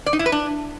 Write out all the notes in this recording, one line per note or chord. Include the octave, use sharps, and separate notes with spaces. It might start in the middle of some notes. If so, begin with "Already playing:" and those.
D5
D#4
E4
B4
D4